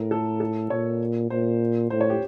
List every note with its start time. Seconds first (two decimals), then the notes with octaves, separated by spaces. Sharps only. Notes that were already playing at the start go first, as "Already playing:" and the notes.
Already playing: A2 A#4
0.11 A4
0.40 A4
0.70 A#2 C#5
1.30 A#2 C5
1.90 A2 C5
2.01 C#5
2.10 G4